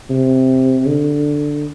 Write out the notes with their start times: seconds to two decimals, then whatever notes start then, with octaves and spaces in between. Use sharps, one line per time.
0.10 C3
0.87 D3